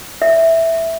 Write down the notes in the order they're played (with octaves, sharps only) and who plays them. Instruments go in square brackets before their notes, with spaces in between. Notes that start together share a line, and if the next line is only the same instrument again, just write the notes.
[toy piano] E5